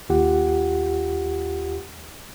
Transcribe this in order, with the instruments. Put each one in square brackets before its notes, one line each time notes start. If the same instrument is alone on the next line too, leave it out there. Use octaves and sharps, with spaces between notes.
[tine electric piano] D#2 F4 G4 F#5